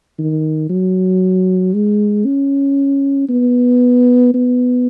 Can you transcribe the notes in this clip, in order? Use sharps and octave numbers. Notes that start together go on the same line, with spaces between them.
D#3
F#3
G#3
C#4
B3
B3